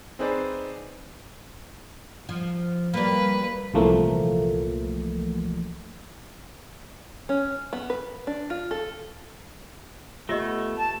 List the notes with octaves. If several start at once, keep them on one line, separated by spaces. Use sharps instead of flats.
C4 D#4 G#4 B4 C5 D5
F3
G3 A#3 B4
C2 A#2 E3 F3 A3 A#3
C#4
B3
B4
D4
F4
A4
A3 B3 F4 G4 D#5
A5